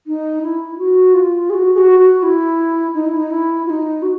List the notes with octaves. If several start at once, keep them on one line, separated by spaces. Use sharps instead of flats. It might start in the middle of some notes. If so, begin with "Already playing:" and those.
D#4
E4
F#4
F4
G#4
F#4
G#4
F#4
F#4
E4
D#4
E4
D#4
E4
F4
D#4
F#4